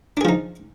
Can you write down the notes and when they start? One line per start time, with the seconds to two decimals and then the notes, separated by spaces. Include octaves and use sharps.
0.17 D4
0.21 G#4
0.25 F3
0.29 D#4